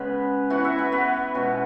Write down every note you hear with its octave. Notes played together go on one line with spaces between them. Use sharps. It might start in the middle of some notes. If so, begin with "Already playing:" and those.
Already playing: C#3 G#3 B3 B4 B5
E3 B3 F#4 F#5
E4 E5
B3 B4
B3 B4
B2 G#3 C#4 F#4